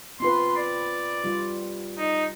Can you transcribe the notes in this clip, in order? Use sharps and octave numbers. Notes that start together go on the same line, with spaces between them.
C4 F4 B4 C6
D5
G3 F4
D#4